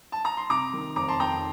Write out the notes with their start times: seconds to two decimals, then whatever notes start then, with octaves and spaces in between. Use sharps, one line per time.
0.12 A5
0.25 A#5
0.37 C6
0.50 C3 A#5 D6
0.73 D#3
0.96 F1 A#5 D6
1.08 A5 C6
1.20 F2 G5 A#5